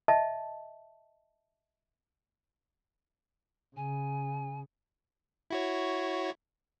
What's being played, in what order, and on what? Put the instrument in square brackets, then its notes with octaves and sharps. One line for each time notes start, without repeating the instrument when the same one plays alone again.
[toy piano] D#5 E5 A5
[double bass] C#3 [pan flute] G#5
[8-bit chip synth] E4 F#4 C#5